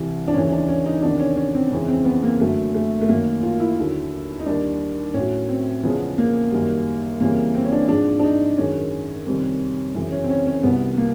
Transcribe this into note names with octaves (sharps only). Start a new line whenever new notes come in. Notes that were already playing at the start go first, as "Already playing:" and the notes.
Already playing: C2 C3 E3 G3
D4
D#2 C#3 E3 C#4
D4
C#4
D#4
E2 C3 D#3 D4
C#4
C#4
C4
F2 C#3 E3 G#3
C4
B3
A#3
F#2 D3 F#3 A3
A3
A3
F#2 D#3 F#3 A#3
F4
E4
D#2 D3 F#3
D#4
D#2 D#3 G3 D4
A2 C#4
F#3
C4
E2 C#3 F3 G#3 B3
A#3
F#2 D#3 G3
F2 C#3 E3 G3 A#3
C4
C#4
D4
G#2 F3 G#3 D4
D4
D#4
F#2 D#3 G#3 C#4
F2 C3 D#3 G3
F#2 C#3 E3 G#3
C#4
C4
C#4
C#4
C2 B2 G3 B3
A#3